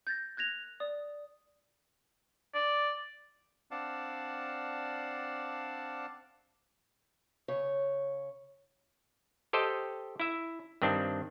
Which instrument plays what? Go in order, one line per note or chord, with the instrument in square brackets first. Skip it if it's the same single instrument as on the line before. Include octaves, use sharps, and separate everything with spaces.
[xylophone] G6 A6 A#6
F#6 G#6 A#6 F7
D5 D#6
[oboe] D5
[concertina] C4 D4 D5 F5 F#5 A5
[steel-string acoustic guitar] C#3 C#5
[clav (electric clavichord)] G4 A4 C5 D#5 G5
E4 E5
G2 D#3 C4 D4